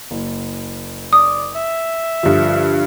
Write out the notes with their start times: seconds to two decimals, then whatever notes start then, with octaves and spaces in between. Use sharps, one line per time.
0.11 F#1
1.13 D5 D#6
1.56 E5
2.23 G2 D3 F3